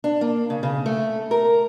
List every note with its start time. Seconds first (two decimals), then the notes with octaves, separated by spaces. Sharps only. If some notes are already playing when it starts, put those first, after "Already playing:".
0.04 D4
0.21 A#3
0.50 C#3
0.63 C#3
0.86 A3
1.31 A#4